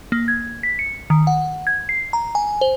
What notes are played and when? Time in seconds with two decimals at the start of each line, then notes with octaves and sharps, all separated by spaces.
0.12 A#3
0.28 G#6
0.63 B6
0.79 C#7
1.10 D#3
1.27 F#5
1.67 G#6
1.89 C7
2.13 A#5
2.35 G#5
2.61 C5